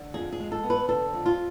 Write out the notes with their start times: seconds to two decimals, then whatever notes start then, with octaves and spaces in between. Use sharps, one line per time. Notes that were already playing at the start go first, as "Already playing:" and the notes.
Already playing: D3
0.14 F2 G#4
0.32 G#4
0.40 G#3
0.52 A4
0.63 B3
0.70 B4
0.88 D3 A4
1.13 F2
1.26 F4